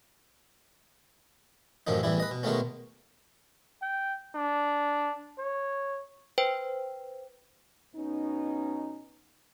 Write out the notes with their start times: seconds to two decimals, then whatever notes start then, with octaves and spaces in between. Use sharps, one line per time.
1.87 A1 F#2 A2 D#3 F3 D#4
2.03 A1 E2 E3 G3 E4
2.20 B4 D#5
2.31 B2
2.43 B2 D#3 G#3 A3 B3 C#4
3.82 G5
4.35 D4
5.38 C#5
6.38 B4 C5 G5
7.96 B2 C#4 D#4